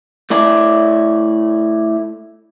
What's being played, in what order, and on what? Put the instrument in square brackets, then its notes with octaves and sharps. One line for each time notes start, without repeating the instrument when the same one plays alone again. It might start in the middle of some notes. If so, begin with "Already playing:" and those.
[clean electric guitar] A3 E4 D5